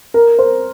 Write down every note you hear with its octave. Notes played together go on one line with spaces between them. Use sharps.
A#4
C5